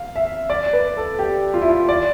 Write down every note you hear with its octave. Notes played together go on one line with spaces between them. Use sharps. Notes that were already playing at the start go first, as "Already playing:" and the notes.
Already playing: F5
E5
D5
B4
A4
G4
F4
E4
F4
D5